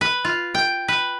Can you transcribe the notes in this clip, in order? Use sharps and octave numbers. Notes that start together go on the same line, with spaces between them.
B4
F4
G5
B4